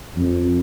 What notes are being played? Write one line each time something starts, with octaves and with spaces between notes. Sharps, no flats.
F2